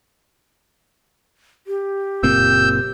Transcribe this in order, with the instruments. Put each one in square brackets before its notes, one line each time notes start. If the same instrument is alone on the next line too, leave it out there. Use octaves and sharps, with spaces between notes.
[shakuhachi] G4
[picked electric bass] F#1 A#2 C4 [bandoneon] E6 G6